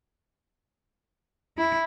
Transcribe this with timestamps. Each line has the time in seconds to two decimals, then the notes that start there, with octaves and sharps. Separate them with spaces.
1.58 E4